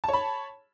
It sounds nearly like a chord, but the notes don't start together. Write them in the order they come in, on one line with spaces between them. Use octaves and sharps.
A5 C#5 B5